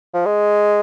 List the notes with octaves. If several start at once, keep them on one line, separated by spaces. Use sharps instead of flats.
F3
G#3